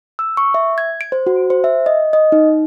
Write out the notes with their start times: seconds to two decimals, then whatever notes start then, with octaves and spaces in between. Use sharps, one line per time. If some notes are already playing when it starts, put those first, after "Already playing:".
0.19 E6
0.37 C#6
0.54 E5
0.78 G#6
1.01 D7
1.12 C5
1.27 F#4
1.50 C5
1.64 E5
1.86 D#5
2.13 D#5
2.32 D#4